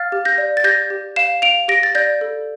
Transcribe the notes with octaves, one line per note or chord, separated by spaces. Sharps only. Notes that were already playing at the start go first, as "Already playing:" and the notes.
Already playing: F5 F6 A6
G4
G6 A#6
D5
A6
G4 G6 A#6
G4
F5 C7 E7
F5 D7 F7
G4 A#6 D7
A6
D5 G6 A#6
A4